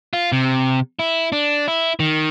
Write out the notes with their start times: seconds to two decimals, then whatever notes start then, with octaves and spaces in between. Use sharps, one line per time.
0.13 F4
0.32 C3
0.99 E4
1.32 D4
1.68 E4
2.00 D#3